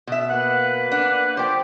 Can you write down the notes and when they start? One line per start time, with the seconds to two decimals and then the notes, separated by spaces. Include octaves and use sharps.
0.07 B2 E5
0.30 A#3 B4 F#5
0.92 D4 F#5
1.37 F3 G4 C5 D5 G5